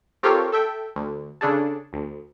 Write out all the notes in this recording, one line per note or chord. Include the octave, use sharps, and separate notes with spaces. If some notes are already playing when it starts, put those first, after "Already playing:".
C4 F4 G4 A4 A#4 C#5
A4 E5 G5
D2
C#3 D4 G#4 A4
D2